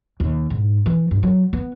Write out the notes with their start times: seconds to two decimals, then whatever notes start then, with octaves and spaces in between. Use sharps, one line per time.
0.20 D#2
0.50 G#2
0.86 E3
1.11 G2
1.23 F#3
1.53 B3